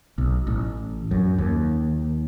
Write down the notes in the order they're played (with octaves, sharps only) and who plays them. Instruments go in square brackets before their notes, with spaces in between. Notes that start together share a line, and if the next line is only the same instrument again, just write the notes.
[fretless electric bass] B1
A1
F#2
D#2